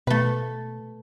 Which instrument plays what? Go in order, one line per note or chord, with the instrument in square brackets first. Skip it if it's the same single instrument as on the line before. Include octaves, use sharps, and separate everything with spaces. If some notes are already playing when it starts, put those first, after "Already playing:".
[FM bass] B2 [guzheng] A3 B4